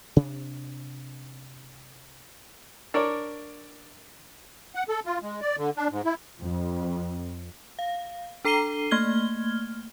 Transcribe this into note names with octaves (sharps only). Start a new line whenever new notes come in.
C3 D4
D4 A#4 C#5 D5
F#5
A4
F4
G#3
D5
D3
D4
G#2
E4
F2
F5
D4 A4 A#5 C7 D#7 G7
A3 A#3 F6 G#6 G7